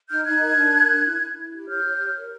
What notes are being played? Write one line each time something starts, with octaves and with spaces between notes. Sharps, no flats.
D#4 F6 G6
D#4 F#6 G#6
A#4
D4
A#4
D4
E4
E4
E4
G4
C#5 F6 G6
G4
C#5
A#4